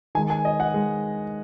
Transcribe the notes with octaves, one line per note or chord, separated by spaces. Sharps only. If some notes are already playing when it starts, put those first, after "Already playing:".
D#3 G#3 G#5
G#5
D#5
F#5
G#3